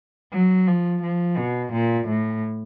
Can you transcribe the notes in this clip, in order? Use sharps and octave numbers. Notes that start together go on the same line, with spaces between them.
F#3
F3
F3
B2
A#2
A2